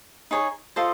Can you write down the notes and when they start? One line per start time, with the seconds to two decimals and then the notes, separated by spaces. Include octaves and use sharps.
0.31 D#4 G#4 C#5
0.76 F4 A4 C5 D#5